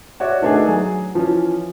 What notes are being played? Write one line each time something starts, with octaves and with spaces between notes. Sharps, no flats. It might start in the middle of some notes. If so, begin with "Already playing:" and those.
F#4 C#5 D5 E5
D#3 A3 B3 D4 D#4 G#4
F#3 G#4
E3 F3 C#4